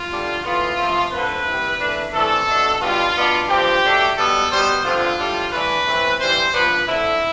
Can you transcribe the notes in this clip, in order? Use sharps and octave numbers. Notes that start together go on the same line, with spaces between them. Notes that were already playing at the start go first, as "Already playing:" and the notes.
Already playing: F4
D3 G3 D4
A2 E3 B3 F4
C3 F3 A3
D3 F3 A3 C4 B4
C3 E3 G3
E3 A3 D4
C3 E3 A3 D4 A4
B2 A3 D4
B2 G3 B3 D4 F4
B2 B3 D4
G2 F3 C4 G4
B2 A3 D4
B2 G3 B3 A4
B2 G3 B3 C5
G2 D3 F3 C4 F4
A2 G3 D4
G2 E3 A3 D4 B4
E3 A3 C4
G2 E3 G3 C5
G2 F3 B3 D4 B4
D3 A3 C4 E4